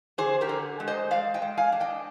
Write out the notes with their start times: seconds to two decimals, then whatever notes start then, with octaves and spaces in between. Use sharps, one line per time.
0.18 D3 G#4 C5
0.41 G4 A#4
0.49 D3
0.80 G#3
0.88 C5 D#5
1.11 G#3 D5 F5
1.34 D#5 G5
1.42 G#3
1.58 F5 G#5
1.72 D4
1.80 D#5 G5